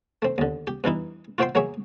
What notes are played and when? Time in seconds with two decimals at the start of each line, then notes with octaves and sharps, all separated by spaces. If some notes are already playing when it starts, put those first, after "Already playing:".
0.22 A3 C4
0.38 D#2 D3
0.67 G4
0.84 G2 E3 D#4 E4
1.38 F4 F#4 C5 E5 G5 C6
1.55 F#3 A#3 G#4 C#5 E5